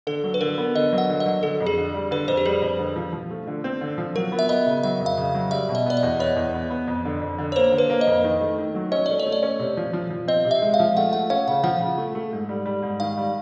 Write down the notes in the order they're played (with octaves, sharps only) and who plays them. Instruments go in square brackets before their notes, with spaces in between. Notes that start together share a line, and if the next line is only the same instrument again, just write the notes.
[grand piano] D3 [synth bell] A4
[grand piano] F#3
[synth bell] B4
[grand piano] D3 [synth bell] A#4
[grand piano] B3
[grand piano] D3 [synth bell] D#5
[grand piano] F#3
[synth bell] F#5
[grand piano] D3
[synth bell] D#5
[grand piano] F#3
[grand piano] D3 [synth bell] A4
[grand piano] F2
[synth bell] G#4
[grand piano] D3
G3
[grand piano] D3 [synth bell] B4
[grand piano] F2 [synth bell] C5
[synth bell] G4
[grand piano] G3 [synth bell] G#4
[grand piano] F2
D3
F3
F3
A3
D3
C4
D3
F3
[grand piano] F#3 [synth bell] A#4
[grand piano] B3
[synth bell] E5
[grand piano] B3 [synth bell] D#5
[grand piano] C#3
[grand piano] F#3 [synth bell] E5
[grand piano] F2
[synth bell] F5
[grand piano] C#3
F#3
[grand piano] G3 [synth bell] E5
[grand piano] B2
[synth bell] D#5
[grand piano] B3 [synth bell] D5
[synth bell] D#5
[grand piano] E2
[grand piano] B3 [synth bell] C#5
[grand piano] E2
B3
B3
F2
D3
F2
D3
[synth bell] C#5
[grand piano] A#3 [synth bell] C5
[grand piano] D3
[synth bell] B4
[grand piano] A#3
[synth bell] D#5
[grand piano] F2
D#3
A3
D#3
F#3
[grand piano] C#4 [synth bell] D#5
[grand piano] A3 [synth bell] D5
[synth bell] C#5
[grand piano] A3
[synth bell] D5
[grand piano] C#4
C3
F3
F3
F3
[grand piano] C4 [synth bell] D#5
[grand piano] C3
[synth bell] E5
[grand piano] G#3
[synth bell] F5
[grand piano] F3
[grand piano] A3 [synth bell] F#5
[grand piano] A3 [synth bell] F#5
[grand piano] C#4 [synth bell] F5
[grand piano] C#3 [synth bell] F#5
[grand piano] F3 [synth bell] F#5
[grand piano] C#3
A3
A3
G#2
G3
G3
G#2
[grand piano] D#3 [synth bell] F5
[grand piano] G3